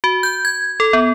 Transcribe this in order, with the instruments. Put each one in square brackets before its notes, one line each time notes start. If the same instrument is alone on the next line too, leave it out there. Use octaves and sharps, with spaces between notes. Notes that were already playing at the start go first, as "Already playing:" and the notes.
[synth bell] F#4
G6
G#6
A4
B3